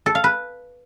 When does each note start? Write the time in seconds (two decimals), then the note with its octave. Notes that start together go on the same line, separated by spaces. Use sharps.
0.06 A4
0.15 F5
0.24 B4